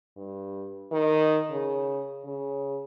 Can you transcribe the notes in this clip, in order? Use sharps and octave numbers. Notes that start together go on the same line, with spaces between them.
G2
D#3
C#3
C#3